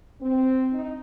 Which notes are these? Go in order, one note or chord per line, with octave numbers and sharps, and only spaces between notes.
C4
D#4